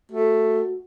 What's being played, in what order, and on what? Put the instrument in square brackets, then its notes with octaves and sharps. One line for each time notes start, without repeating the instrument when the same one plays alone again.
[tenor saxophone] A3 [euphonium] F#4